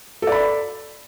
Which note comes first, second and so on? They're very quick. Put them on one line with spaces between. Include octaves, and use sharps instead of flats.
A4 D5 B5